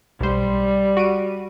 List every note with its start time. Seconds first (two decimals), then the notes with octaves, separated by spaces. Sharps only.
0.21 B1 G3 C5
0.97 F#4 D7 D#7